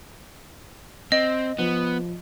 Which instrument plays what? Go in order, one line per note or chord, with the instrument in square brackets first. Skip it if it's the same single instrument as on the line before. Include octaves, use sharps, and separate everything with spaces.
[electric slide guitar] C4 [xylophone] D#5
[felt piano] F3 [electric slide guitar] B3